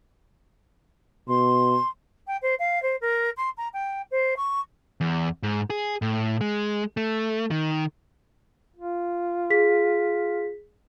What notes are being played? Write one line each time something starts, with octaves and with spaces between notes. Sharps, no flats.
B2 C6
G5
C5
F5
C5
A#4
C6
A#5
G5
C5
C#6
E2
G#2
G#4
A2
G#3
A3
D#3
F4
G#4 B6